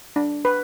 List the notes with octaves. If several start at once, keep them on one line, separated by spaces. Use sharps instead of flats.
D4
B4